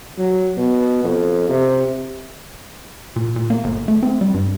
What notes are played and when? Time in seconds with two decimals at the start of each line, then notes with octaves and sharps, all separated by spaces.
0.18 F#3
0.57 B2
1.04 F2
1.49 C3
3.16 A#2
3.36 A#2
3.50 A#3
3.64 G1
3.88 A3
4.03 C4
4.21 G3
4.34 G2